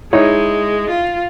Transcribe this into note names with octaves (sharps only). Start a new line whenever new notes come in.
G#3 D#4 E4 C#5
F4